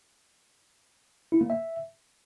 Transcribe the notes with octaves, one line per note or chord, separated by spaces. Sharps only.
E4
A#3
E5